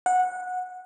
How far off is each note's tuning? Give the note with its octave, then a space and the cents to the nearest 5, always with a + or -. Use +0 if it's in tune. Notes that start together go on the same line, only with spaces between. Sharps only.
F#5 -15